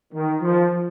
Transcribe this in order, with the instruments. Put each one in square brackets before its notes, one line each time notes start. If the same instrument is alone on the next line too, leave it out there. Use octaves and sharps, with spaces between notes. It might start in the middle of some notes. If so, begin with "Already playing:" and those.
[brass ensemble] D#3
F3